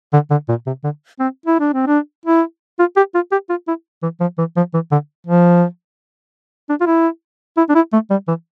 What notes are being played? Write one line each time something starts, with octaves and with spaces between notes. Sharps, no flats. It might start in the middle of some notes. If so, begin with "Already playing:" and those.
D3
D3
A#2
C3
D3
C4
E4
D4
C4
D4
E4
F4
G4
F4
G4
F4
E4
E3
F3
E3
F3
E3
D3
F3
D4
F4
E4
E4
D4
E4
A3
G3
E3